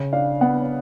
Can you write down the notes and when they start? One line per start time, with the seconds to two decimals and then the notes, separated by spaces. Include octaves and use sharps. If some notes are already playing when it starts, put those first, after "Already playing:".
Already playing: C#3
0.13 D4 F5
0.41 B3 F#5